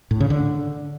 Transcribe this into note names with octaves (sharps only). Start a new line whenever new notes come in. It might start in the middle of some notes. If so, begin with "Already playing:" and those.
A2
C#3
D3